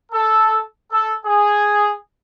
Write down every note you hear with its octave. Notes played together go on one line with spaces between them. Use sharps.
A4
A4
G#4